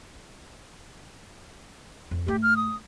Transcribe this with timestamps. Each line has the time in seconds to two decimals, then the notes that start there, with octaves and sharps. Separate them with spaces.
2.11 F2
2.27 G#2 A3 G4
2.42 F6
2.57 D#6